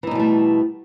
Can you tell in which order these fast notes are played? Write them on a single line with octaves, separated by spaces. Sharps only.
E3 D#4 B2 G3 A3